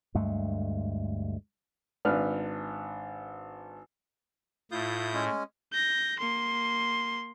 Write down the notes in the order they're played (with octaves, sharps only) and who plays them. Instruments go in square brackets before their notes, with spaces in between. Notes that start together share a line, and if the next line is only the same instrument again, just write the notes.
[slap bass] D2 G2 G#3 A3
[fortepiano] G#1 D4 B4 F6
[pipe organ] A2 [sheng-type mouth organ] E4 D#6 G6 [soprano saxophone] F4
[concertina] G#3 C#4
[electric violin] G6 A#6
A#3 C6